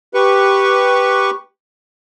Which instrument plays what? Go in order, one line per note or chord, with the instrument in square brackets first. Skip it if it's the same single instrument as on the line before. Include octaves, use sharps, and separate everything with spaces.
[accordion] G4 B4 C#6